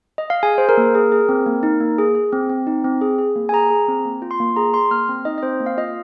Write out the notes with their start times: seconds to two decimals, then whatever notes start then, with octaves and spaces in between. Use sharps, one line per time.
0.18 D#5
0.30 F5
0.43 G#4 G#5
0.58 G#4 C5
0.69 A#4
0.77 A#3
0.95 G#4
1.12 G#4
1.29 C4
1.46 A#3
1.63 D#4
1.80 A#3
1.98 G#4
2.15 G#4
2.33 C4
2.49 C4
2.67 D#4
2.84 C4
3.01 G#4
3.18 G#4
3.36 A#3
3.49 G#5
3.53 G#4 A#5
3.70 G#4
3.88 C4
4.05 A#3
4.22 F4
4.31 C6
4.40 A#3
4.56 G#4 A#5
4.74 G#4 C6
4.91 A#3 F6
5.09 C4
5.25 D#4 D#5
5.38 D#5
5.43 C4 C5
5.60 A#3
5.66 F5
5.77 F4 D#5